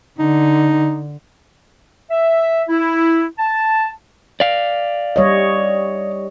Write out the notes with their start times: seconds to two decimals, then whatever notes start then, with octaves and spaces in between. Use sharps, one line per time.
0.19 D3 D#4
2.11 E5
2.69 E4
3.39 A5
4.40 D5 F5
5.16 G3 C#5 D#5